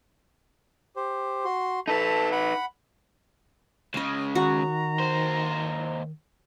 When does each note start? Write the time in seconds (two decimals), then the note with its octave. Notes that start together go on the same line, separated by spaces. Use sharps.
0.96 G4 C5
1.45 F#4 C6
1.88 D#4 A4 B4 A5
2.32 F#5 B5
3.94 C#2 C#3 D#5 F5
4.35 D#3 F#4 A#5
5.00 D#2 C5